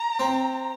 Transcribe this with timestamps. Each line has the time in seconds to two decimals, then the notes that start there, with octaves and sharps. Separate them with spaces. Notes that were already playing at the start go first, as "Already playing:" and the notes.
Already playing: A#5
0.19 C4